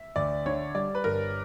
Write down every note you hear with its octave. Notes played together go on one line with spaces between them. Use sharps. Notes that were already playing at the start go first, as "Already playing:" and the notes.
Already playing: E5
D2 D5
D3 C#5
G3 D5
B4
G1 A#4